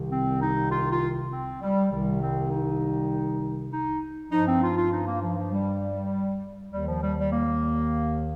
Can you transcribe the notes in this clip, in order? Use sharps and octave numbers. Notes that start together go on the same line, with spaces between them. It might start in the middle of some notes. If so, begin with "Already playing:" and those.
Already playing: C2 C3 D#3
C4
D#4
F4
F4
C4
G3
C2 C3 D#3 G3
C4
D#4
D#4
G2 F3 D#4
C4
F4
F4
D#4
A#3
F3
F3
G3
D#2 D#3 G3
F3
G3
G3
A#3